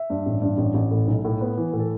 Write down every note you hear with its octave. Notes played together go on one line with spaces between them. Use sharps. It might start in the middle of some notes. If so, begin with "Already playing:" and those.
Already playing: E5
G2
A1
G2
A1
A1
A2
B1
A2
B3
E3
A2
A4